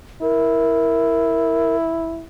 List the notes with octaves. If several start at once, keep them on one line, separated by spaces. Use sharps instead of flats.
E4 A#4